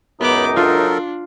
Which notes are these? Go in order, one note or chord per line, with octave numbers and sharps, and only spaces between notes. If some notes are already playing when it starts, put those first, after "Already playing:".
C#2 F#2 B3 D#4 D6
F#3 D4 F4 A4 A#4